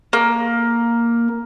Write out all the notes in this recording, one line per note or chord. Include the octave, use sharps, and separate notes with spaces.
A#3